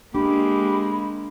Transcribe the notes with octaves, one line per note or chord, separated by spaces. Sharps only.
G#3 A#3 D4 G4 B5